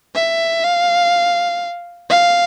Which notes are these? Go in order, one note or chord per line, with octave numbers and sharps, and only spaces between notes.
E5
F5
F5